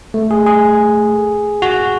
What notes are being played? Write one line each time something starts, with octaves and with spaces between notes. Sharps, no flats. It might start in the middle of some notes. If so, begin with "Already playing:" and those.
A3
G#4
G#4
F#4